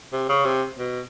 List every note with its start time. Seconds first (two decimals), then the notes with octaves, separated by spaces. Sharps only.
0.12 C3
0.29 C#3
0.45 C3
0.79 B2